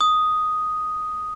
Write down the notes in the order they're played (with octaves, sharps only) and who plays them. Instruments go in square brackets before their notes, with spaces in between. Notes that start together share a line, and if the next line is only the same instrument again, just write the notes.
[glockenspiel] D#6